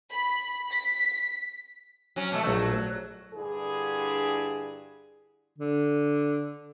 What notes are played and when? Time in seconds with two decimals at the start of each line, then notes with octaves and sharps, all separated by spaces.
0.13 B5
0.70 B6
2.16 F#3 C#4
2.32 B2 A3
2.44 A#1 F#3 A3
3.34 G2 D3 E4 G#4
5.58 D3